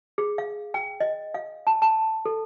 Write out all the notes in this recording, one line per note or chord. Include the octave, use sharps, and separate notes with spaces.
G#4
F5
G5
D#5
F5
A5
A5
A4